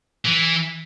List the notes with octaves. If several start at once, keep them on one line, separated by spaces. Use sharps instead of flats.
E3